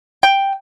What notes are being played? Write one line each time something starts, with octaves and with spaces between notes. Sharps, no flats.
G5